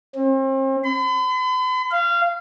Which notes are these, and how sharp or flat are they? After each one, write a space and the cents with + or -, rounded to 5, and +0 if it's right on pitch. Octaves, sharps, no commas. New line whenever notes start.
C4 +40
B5 +45
F5 -20